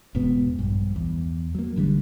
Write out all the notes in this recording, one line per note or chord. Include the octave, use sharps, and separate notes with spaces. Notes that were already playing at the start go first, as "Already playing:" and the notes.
E1 G#2 B2 B3
A#1 G2
E2
F#3 A#3
A1 D3 F#3 G3